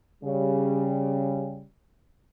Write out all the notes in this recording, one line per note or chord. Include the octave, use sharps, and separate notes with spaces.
C#3 G3